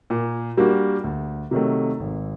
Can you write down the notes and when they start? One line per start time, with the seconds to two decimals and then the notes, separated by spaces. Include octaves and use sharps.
0.10 A#2
0.57 G3 A#3 D4 F#4
1.04 D2
1.51 C3 D#3 F#3 A3
2.00 G#1